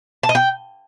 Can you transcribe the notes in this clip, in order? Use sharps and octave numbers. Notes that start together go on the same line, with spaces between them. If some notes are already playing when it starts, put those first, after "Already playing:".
A5
D#5
G5